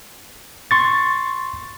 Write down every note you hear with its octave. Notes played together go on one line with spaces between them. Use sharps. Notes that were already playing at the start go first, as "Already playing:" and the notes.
C6 C#6 A6